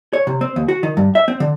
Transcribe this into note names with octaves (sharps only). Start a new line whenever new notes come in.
C#5
C3
C4
D#2
F#4
D#3
G2
E5
C4
D3